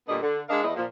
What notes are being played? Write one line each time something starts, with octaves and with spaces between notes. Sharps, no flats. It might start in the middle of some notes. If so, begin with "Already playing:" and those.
A#2 D3 G3 B3 D#5
D3
G#3 D4 D#4 A#4 D#5 F5
E2 E4 D#5
A#2 F3